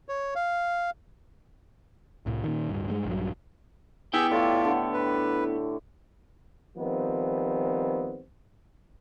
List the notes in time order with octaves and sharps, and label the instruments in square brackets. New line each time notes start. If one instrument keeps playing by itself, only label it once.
[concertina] C#5
F5
[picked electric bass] C2 A2
A#2 D#3
D1 G2
G2 G3 G#3
A#1 G2 F#3
[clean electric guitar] B3 E4 G5 [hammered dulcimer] G4 [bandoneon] G#4 E6 G6
[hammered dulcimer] A2 C#5 [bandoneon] F4 D5
[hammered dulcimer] D3 A4
[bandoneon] B4
[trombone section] D#3 F3 G3 B3 C4